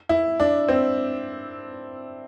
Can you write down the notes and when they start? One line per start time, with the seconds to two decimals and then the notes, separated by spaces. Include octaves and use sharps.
0.09 E4
0.40 D4
0.68 C4